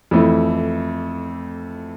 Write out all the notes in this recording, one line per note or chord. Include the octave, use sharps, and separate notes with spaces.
F2 E3 A3 E4